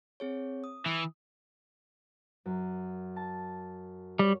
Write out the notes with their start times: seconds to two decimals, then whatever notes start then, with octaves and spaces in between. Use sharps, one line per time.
0.20 C4 G#4 C#5
0.64 D#6
0.86 E3
2.46 F#2
3.16 A5
4.19 G3 C#5